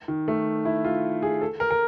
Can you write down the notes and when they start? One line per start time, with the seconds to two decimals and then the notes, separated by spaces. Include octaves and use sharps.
0.08 D#3
0.28 A3
0.65 E4
0.85 F4
1.22 G#4
1.41 A4
1.60 A#4
1.71 A#4